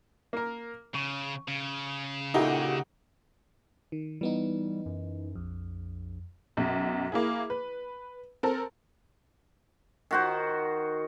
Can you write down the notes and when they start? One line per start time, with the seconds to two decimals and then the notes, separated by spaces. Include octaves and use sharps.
0.33 A#3 A#4
0.95 C#3 C#6
1.48 C#3
2.34 A#2 D#4 E4 F#4 G4 A4
3.92 D#3
4.21 E3 G3 B3 D#4
4.86 F#2
5.35 A#1 F2
6.57 B1 F#2
7.12 A#3 E4 G#4
7.50 B4
8.43 C4 A4 A#4
10.11 D#3 F#4 C5